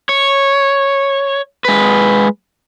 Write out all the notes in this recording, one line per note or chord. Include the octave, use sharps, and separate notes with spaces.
C#5
G#3 B4